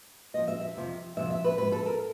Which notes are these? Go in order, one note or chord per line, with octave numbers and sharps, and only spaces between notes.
A#2 F3 D#5
E5
E5
F2 C3 F3
F2 C3 F3 E5
E5
B4
G#2 F3 B4
A4
A#4